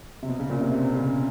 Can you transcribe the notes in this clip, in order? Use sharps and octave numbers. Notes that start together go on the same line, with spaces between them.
C3
B2
C#3
A#2
C3
B2
C3
C#3